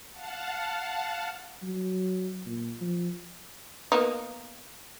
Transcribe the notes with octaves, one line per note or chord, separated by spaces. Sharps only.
F5 F#5 A5
F#3
A#2
F3
A#3 B3 D#4